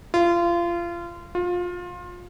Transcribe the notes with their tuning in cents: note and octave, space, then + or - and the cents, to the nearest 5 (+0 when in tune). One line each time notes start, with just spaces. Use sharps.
F4 -25
F4 +25